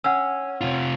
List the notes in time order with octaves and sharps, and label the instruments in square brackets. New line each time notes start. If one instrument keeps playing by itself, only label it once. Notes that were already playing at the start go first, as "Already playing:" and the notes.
[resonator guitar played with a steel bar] C#4 [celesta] F#5 E6
[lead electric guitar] C3 F4